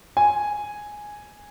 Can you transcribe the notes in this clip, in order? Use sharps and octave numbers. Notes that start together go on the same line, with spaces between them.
G#5